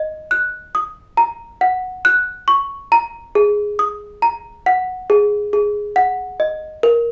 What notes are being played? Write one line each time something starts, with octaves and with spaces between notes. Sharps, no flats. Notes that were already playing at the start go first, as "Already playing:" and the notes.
Already playing: D#5
F#6
D#6
A#5
F#5
F#6
C#6
A#5
G#4
D#6
A#5
F#5
G#4
G#4
F#5
D#5
A#4